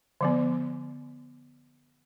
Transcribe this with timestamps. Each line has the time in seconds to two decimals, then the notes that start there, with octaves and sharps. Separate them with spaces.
0.21 D3 F3 B3